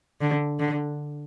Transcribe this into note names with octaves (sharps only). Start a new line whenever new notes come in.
D3
D3